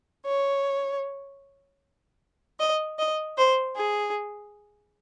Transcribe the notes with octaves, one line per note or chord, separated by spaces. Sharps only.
C#5
D#5
D#5
C5
G#4